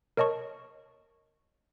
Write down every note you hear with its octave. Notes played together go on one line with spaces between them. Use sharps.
A#4 C#5 D#5 A5 C#6